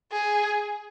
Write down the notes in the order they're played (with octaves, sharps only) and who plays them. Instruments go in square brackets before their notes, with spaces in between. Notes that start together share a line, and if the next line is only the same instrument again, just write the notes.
[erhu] G#4